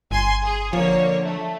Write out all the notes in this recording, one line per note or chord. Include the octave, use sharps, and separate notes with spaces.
G1 G#5 C6
G#4
D3 F3 A#3 C#5
A3